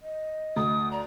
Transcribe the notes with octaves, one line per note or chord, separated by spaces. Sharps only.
D#5
D2 D#6
D5 A#5